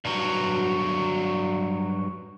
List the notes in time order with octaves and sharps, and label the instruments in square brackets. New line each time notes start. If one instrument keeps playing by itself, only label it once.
[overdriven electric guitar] G2 F#3